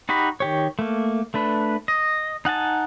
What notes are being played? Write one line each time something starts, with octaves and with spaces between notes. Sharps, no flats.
D#4 F#4 G4 B5
D#3 G4 C#5
A3 A#3
A3 D4 B4
D#5
D#4 F#5 G#5 A5